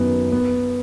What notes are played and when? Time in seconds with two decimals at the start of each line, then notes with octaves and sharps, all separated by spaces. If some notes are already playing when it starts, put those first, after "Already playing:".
Already playing: F#2 D#3 B3
0.32 B3